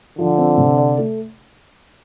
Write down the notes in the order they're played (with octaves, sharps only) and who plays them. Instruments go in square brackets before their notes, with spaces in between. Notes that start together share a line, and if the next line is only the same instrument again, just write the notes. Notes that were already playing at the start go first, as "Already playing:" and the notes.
[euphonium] D3 [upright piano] F3
[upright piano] C4
C3
D5
A3